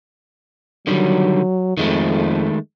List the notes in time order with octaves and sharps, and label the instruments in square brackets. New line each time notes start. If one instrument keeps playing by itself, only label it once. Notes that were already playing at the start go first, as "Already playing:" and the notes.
[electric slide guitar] D3 D#3 G3 [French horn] F#3
[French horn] F2 [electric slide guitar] D#3 G#3 A3